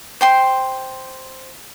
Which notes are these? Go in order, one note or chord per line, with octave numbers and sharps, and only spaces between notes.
C5 G5 C6